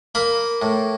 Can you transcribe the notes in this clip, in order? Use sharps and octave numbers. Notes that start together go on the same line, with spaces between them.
A#3 B5
A2